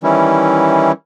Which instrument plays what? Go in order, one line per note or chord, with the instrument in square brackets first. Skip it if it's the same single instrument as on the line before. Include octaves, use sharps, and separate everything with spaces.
[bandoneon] D#3 E3 G3 C#4 E4